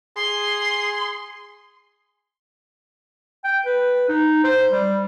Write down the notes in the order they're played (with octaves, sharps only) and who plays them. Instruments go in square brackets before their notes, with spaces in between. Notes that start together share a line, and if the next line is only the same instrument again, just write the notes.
[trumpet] G#4 [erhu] C6
[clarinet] G5
B4
D#4
C5
G3